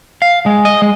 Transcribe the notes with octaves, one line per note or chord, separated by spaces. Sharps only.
F5
G#3
D#5
G#3